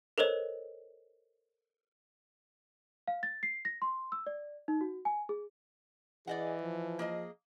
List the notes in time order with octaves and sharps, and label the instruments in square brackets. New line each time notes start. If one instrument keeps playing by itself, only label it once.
[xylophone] A4 A#4 C5 C#5 D#5
[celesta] F5
A6
C7
A#6
C6
E6
D5
D#4
F#4
G#5
G#4
[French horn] E3 [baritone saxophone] G#4 [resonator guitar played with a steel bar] D5 D#5 F#5
[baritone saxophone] F3
[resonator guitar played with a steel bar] A#3 G#4 D#5